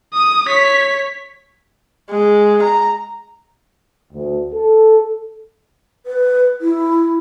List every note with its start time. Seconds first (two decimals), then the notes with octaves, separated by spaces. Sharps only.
0.13 D#6
0.47 C#5 B6
2.10 G#3
2.62 A#5
4.13 D2
4.53 A4
6.06 B4
6.61 E4